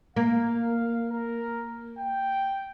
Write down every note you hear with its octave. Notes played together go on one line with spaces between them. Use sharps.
A#3 F5
A#4
G5